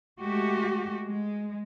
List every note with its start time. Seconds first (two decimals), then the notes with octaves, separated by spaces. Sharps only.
0.20 G#3 A3 F#4 G4
1.06 G#3